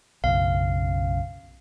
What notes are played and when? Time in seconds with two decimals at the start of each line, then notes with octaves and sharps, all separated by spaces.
0.24 B1 F#2 C#3 F5